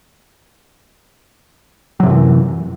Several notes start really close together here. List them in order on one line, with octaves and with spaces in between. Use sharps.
F#3 C3 F#2 E3